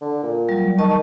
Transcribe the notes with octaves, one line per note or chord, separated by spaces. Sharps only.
D3
A#2
F#3 G3
D#3 D#5 A5 C#6